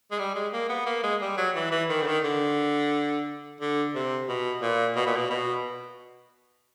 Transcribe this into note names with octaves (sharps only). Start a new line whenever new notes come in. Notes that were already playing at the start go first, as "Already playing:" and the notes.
G#3
G3
G#3
A#3
B3
A#3
G#3
G3
F#3
E3
E3
D#3
D3
D#3
D3
D3
C3
B2
A#2
B2
A#2
B2
B2